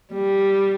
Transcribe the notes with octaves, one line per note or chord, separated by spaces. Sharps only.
G3